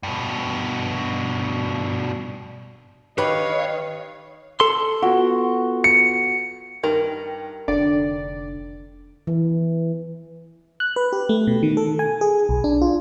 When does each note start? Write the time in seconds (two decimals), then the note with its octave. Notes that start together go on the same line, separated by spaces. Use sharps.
0.03 G2 B2
3.18 D#3 G4 B4 C#5 D#5 F5
4.60 A4 C6
5.02 B3 F4 F#4
5.84 C#7
6.83 G2 D#3 A#4
7.68 F1 D3 D5
9.27 E3
10.80 F#6
10.96 B4
11.13 G4
11.29 A3
11.47 B2
11.63 D#3
11.77 A4
11.99 G#5
12.21 G#4
12.49 B1
12.64 D4
12.81 F4